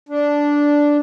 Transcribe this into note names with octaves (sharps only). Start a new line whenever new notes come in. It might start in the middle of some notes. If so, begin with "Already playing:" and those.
D4